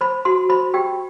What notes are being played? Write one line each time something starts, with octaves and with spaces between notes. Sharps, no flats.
C5 B5
F#4 C6
C5 B5
G4 G5